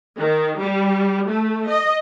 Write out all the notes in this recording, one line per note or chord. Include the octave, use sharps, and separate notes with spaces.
D#3
G3
A3
D#5